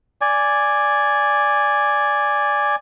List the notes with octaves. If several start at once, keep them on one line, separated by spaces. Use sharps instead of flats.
D5 G#5